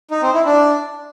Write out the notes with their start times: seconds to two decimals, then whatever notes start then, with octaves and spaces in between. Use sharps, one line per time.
0.11 D#4
0.22 C4
0.34 E4
0.45 D4